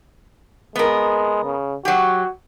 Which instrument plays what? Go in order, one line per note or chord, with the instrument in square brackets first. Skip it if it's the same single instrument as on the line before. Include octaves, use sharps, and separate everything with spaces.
[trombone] G#3 [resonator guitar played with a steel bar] B3 A#4
[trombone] C#3
[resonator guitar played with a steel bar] F#3 G4 [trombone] F#4